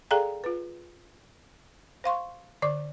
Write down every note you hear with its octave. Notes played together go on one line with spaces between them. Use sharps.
G#4 A4 D5 F5 G5 A#5
F4 B4
C5 F5 C6 C#6
D3 D5 D6